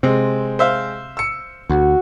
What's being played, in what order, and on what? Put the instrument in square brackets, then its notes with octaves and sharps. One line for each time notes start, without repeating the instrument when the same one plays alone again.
[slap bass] C3 [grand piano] G#3 C4
[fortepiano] C5 E5 F5
[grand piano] E6 C#7
[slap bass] D2 [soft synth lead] F#4